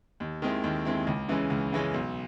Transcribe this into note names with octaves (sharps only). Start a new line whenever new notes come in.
D#2
D#3 G#3 C4 E4
D#2
D#3 G#3 C4 E4
C#2
C#3 E3 G#3 C#4
C#2
C#3 E3 G#3 C#4
B1